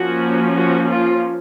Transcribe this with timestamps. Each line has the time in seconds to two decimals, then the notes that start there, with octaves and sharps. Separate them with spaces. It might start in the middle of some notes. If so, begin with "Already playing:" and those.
Already playing: F3 A#3 C#4 F#4
0.56 F#4
0.89 F4